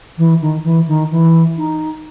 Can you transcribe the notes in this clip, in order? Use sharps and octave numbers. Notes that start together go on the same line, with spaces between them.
E3
D#3
E3
D#3
E3
D#4